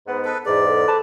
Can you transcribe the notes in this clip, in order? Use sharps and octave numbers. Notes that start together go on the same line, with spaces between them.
G#2 B3
A4 B4
E2 G#2 G#4 D5
A4
B4 C5 A5